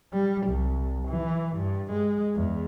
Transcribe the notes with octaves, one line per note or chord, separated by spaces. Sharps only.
G3
C2
E3
G2
G#3
E2